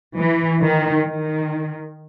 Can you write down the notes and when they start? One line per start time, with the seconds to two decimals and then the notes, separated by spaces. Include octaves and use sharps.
0.16 E3
0.61 D#3
1.06 D#3